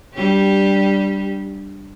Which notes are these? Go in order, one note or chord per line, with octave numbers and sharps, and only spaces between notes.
G3 D4 G4